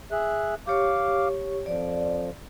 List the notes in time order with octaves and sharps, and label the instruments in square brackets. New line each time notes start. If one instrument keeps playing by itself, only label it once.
[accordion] G#4 E5 F#6
[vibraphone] G4 C#5 C#6 [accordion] F5 D6
[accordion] F2 F3 [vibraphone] D5